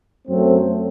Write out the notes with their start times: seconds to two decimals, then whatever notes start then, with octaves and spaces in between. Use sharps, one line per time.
0.28 F#2 F#3 A3 C4